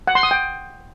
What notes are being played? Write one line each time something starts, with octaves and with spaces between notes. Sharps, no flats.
F#5
C6
D#6
G5